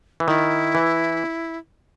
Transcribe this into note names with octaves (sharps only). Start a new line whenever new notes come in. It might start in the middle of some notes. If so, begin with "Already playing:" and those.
E3
D#3 E4
E3